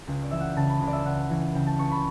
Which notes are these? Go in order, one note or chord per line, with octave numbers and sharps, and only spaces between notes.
C#2 G5
D5
E3 E5
F#5
G5
C#3 A5
B5
C#2
D5
E5
C#2 F#5
E3
C#3 G5
A5
C#2 C#6
B5